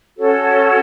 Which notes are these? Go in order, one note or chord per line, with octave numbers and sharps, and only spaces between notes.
C#4 F#4 A4 C#5